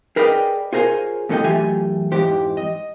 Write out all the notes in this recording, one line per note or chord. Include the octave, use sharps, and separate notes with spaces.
G#4 A#4 B4 D5 D#5 G5
F4 G#4 A#4 C5 C#5 G#5
D#2 A2 D3 A4 D#5 G5
F#2 E3 A3 F4 G4 G#5
F2 G#2 E3 G4 C5
D#5